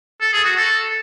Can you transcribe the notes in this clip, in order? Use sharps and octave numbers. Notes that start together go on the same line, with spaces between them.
A4
G#4
F#4
A4